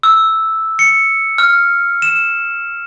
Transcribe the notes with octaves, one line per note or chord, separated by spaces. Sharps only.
E6
C#7
F6
E7